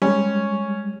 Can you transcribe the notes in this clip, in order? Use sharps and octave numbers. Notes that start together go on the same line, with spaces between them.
G3 G#3 C#4